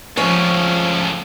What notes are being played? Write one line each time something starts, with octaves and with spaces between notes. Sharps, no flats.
C#2 A2 F3 C#4